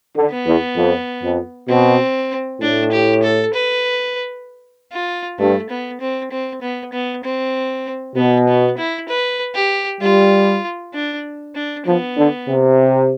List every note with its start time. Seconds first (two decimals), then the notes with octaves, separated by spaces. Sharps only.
0.15 D3
0.31 B3
0.46 E2
0.76 F2
1.23 F2
1.68 B2 C4
2.61 A2 D4
2.92 G4
3.23 A4
3.54 B4
4.92 F4
5.39 G2 A3
5.70 B3
6.01 C4
6.31 C4
6.62 B3
6.93 B3
7.24 C4
8.16 B2 B3
8.48 B3
8.78 E4
9.09 B4
9.54 G4
10.01 G3 F4
10.94 D4
11.55 D4
11.86 F3 B3
12.17 D3
12.48 C3